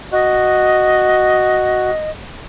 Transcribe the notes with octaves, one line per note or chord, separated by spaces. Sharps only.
F#4 D#5